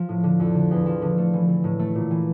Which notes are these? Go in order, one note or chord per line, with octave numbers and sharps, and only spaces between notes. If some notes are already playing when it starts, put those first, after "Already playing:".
Already playing: F3
A2
D3
F2
D3
E2
F3
D3
A3
E3
E3
A2
A3
A#2
E3